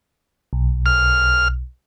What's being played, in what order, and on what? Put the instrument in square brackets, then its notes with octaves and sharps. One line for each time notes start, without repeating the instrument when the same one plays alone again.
[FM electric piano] B1
[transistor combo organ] F6